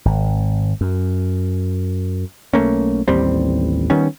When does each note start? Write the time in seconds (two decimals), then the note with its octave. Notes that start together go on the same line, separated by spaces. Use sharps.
0.05 G#1
0.81 F#2
2.54 B1 A3 A#3 C#4
3.08 A1 D#2 G3 C4
3.90 D#3 G3 B3 C#4